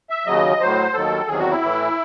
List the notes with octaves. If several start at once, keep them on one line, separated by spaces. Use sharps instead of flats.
E5
D#2 C#3 F#3 D#5
A2 F#3 C5
D#2 D#3 F#3 A4
E2 C3 D#3 F#3 G#4
F#4
E4
A2 E3